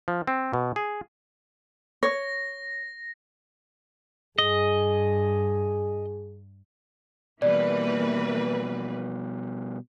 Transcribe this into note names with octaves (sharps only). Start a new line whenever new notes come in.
F3
C4
B2
G#4
C#5 A#6
G2 G#4 D#5
B2 E3 G3 A#3 B4 D5